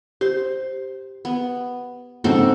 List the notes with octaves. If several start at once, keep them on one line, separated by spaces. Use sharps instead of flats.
G4 C5
B3
G#2 C#3 C4 F#4 A4